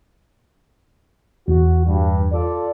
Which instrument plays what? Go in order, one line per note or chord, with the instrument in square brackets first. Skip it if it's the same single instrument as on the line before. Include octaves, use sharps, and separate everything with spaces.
[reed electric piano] E2 [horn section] F#4
[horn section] G2
F4 A4 D5